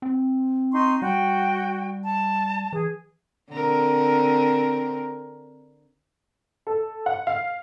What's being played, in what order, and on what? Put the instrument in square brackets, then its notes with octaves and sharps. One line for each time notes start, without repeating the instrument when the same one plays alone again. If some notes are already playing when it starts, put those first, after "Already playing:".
[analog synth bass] C4
[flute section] D#4 C6 C#6
[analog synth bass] G3 [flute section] F#4 G5
[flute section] A5
[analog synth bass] E3 [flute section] G#4
[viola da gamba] D3 C4 A#4
[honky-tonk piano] A4
F#5
F5